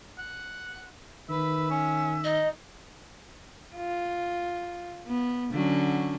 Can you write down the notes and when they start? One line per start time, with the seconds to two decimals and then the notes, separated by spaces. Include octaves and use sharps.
0.18 F#5
1.29 D#3 B4 E5
1.70 C#4
2.24 D#4 D#5
3.76 F4
5.07 B3
5.51 D3 F#3 C#4